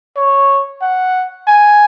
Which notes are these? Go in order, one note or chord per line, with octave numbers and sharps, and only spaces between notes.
C#5
F#5
G#5